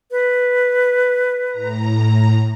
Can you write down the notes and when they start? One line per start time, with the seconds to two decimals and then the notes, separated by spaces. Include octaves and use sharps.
0.11 B4
1.50 A2 A#5